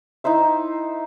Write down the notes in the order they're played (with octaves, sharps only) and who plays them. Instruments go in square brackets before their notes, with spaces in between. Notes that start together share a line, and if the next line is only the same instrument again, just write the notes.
[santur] D#4 E4 C5 E5